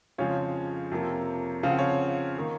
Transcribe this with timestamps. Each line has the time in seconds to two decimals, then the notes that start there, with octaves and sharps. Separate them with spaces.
0.18 F2 C#3 F3 G#3 C#5 F5
0.91 F2 C3 F3 A#3
1.63 C#3 F3 C4 F5
1.71 F#5
1.79 C#5 F5
2.38 D#3 A#3